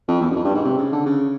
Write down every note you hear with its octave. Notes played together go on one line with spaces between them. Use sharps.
F2
E2
F#2
F2
G2
G#2
C3
C#3
D3
C#3